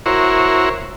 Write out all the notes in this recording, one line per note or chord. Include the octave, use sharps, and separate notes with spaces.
E4 F#4 A#4 C5 C#5